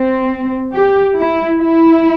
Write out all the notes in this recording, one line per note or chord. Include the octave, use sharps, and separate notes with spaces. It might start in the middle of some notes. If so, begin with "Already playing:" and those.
Already playing: C4
G4
E4
E4